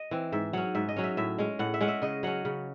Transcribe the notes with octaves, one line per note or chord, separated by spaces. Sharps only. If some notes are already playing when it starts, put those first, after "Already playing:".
Already playing: D#5
E3 C4
G#2 E5
F#3 C#4 F#5
G#2 E5
D#5
F#3 C#4
E5
A2 E5
G#3 C#4
A2 F#5
E5
G#3 C#4 F#5
E5
C#3 D#5
F#3 C#4 F#5
C#3